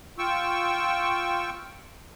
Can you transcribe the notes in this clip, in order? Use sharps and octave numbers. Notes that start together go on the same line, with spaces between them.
F4 G5 C#6 E6